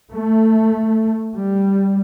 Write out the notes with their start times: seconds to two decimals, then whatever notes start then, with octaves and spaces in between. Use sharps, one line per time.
0.14 A3
1.35 G3